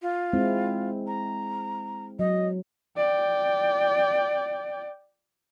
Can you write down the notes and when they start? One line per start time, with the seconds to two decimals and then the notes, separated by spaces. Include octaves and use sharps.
0.02 F4
0.33 G#3 C4 E4
1.07 A#5
2.19 F#3 D#5
2.97 D5 G5